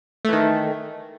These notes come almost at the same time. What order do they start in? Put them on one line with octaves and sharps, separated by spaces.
A3 E3 D#3